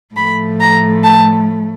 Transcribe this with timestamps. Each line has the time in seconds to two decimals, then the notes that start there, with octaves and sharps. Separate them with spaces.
0.16 A2 F3 A3 B5
0.60 A#5
1.04 A5